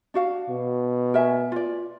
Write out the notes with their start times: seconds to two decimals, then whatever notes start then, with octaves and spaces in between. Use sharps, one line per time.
0.14 D4 F#4 F5
0.49 B2
1.14 A#4 E5 G#5
1.52 F4 D5